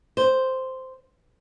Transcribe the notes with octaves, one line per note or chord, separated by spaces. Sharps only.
C5